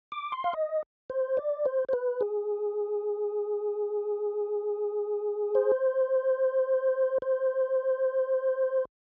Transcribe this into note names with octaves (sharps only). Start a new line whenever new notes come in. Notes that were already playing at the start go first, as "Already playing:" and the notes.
D6
C6
F5
D#5
C5
D5
C5
C5
B4
G#4
C5
C5